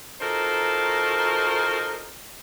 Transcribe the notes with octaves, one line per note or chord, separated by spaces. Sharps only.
D#4 F4 F#4 A4 A#4 C5